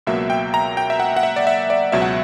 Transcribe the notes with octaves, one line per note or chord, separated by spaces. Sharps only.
C#2 B2 F#3 A#3 E5
G5
A#5
G5
E5
F#5
F#5
E5
D5
E5
D5
C#2 B2 F#3 E5
F#5